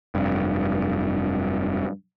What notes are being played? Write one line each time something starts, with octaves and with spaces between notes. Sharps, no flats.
F1 G2